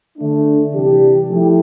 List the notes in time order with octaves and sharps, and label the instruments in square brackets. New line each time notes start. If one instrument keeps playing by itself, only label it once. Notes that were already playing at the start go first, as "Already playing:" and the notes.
[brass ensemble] D3 A3 D4
C3 E3 G3 D4 G4
F3 A3 E4 G4